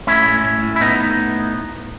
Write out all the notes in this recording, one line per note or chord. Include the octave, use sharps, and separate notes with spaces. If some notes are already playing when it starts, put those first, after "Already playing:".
A2 C#4 E4
A2
A2
A2
E4
A2 B3 D#4
A2
A2